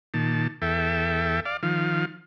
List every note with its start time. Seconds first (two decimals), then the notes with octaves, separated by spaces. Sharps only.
0.14 A#2 D#3 A5
0.62 E2 A4 E5 G5
1.45 D5 F5
1.63 D#3 F3 F5